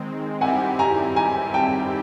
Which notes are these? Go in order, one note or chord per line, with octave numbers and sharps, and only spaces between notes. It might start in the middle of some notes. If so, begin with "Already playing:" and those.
Already playing: D#3 G#3 C4
D#3 G3 C4 E4 G4 F#5 G#5
G#5 A#5
G#5 A#5
G5 A5